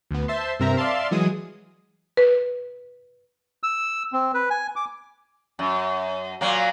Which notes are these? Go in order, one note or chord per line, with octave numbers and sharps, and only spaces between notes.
D2 B3
C5 E5 A5 C6
G2 C3 C4 A#4 E5 A#5
D5 E5 F5 A5 C6
E3 F#3 G#3 G#4 D#6
B4
E6
C4
B4
G#5
D6
F#2
A#2 F#3 A#3